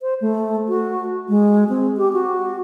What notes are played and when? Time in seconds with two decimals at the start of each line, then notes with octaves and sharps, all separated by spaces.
0.01 C5
0.21 A3
0.68 F#4
1.29 G#3
1.69 C4
1.97 G4
2.13 F#4